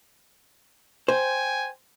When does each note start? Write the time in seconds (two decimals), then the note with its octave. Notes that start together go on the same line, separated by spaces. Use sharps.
1.08 C5 G5 G#5